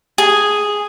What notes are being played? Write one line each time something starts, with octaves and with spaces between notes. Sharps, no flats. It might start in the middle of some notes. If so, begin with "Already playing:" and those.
G#4